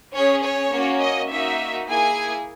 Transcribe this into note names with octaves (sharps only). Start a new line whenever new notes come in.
C#4 G#4 C#5
C#5
A#3 C#4 F#4
D#5
A#3 D#4 F#4 E5
A#3 E4 G#4 G#5